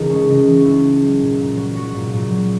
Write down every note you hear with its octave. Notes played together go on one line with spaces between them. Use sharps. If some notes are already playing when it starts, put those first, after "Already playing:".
Already playing: C#2 C#3 E3 D#4 A#4
G#3 C#4
C#3 D#4
E3
F#4
C#2 E4
G#3
F#3
A#2
A#2
F#3
F#3 F#4
A#2
A#2
F#3